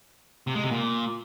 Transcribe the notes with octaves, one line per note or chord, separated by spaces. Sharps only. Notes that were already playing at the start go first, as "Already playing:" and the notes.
C3
G#3
C3
A#2